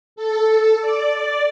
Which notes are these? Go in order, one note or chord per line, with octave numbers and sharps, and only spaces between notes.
A4
D5